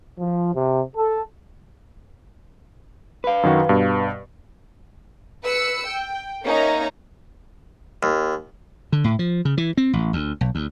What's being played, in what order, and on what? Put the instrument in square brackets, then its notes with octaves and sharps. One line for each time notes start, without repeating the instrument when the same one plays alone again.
[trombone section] F3
C3
A4
[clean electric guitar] B4 F5
[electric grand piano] F#2 D#3 F#4
G2 B2
[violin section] B4 E6 C#7
G5
A#3 C#4 D#4 C#5 E5 A#5
[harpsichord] D#2
[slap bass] D3
A2
F3
C#3
E3
C4
A1
D2
B1
D2